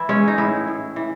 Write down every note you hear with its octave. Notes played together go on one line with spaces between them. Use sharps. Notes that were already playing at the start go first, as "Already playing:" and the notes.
Already playing: E3 E4
G#3 C#4
D#4
A2 E4
A2
E3